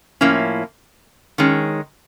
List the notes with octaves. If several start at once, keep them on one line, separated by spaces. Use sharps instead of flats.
A2 F3 A#3 C#4 E4
D#3 G#3 C#4